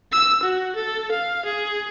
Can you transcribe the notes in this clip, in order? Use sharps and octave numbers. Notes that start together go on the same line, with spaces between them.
E6
F#4
A4
F5
G#4